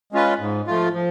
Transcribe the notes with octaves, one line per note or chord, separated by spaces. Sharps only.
G#3 C#4 F4 B4
G#2
F3 A3 F4
F3